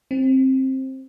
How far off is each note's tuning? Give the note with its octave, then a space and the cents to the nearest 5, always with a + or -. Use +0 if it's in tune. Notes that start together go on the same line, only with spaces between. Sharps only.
C4 +15